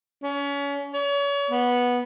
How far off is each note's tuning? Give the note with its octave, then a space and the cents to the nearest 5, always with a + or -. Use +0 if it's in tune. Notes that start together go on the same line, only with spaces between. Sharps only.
C#4 +30
C#5 +35
B3 -10